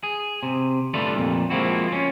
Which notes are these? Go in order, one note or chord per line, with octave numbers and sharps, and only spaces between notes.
G#4
C3
G3 A3 D4 F4 A4 B4
F2 A#2
F3 G#3 A#3 C4 E4 F#4
C#4 F4